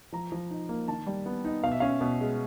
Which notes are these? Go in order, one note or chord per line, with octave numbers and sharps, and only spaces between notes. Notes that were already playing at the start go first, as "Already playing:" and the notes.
F3 A#5
F3
D#4
A#3
D#3 A5
G3
B3
D#4
B2 F5
E5
C#4 F5
B2
G#3